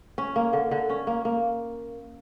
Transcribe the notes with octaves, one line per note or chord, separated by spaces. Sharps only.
C#4
A#3
D3
D3
C#4
A#3
A#3